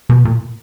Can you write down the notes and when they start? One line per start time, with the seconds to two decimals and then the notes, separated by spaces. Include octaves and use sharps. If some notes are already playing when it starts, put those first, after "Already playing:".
0.09 B2
0.25 A#2